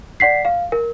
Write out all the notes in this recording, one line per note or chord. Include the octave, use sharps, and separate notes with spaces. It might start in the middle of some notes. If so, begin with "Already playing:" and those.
D5 F#5 B6 C7
F5
A#4